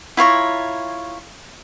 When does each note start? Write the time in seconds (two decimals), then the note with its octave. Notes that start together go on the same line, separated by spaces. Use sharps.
0.17 E4 F4 C#5 A#5